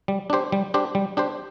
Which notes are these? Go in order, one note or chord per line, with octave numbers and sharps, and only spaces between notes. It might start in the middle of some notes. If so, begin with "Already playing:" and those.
G3
D4 G4 C5
G3
D4 G4 C5
G3
D4 G4 C5